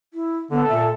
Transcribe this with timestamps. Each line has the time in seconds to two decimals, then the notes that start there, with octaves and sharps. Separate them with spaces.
0.14 E4
0.51 D3 B3 A4
0.68 A#2 E5